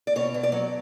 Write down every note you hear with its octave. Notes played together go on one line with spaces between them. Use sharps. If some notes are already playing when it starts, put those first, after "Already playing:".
D5
B2 C#5
B2
D5
F#3 C#5